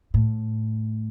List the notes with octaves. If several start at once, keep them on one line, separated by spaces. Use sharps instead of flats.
A2